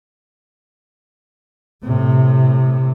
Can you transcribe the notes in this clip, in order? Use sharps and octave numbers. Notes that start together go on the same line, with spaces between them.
A2 C3